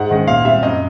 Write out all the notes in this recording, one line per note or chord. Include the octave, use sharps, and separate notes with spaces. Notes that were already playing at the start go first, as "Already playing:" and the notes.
Already playing: G#2 F#5
D#3 G#3 C#4
A#2 F5
G3 C4 E5
F#2 D#5